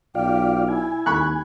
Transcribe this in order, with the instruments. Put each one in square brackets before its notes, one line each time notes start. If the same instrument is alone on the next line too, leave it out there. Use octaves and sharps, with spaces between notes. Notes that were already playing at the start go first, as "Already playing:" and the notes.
[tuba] B1 [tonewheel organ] F4 D5 F5 [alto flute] G5
[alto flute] E4 [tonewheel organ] G#5
[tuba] D#2 [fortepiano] B5 C#6 F#6